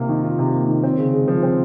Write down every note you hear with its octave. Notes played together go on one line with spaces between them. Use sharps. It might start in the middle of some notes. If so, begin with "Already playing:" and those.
Already playing: C3 A#3 F4
D#3
F4
C3
A#3
D#3
C4
C#3
G#3
F3
C4